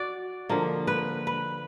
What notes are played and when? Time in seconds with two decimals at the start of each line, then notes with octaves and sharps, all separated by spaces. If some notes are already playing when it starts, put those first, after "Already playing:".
Already playing: F#4 D5
0.49 D3 F3 A#3
0.87 B4
1.27 B4